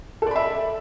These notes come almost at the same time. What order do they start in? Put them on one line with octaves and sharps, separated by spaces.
A4 D5 B5 E5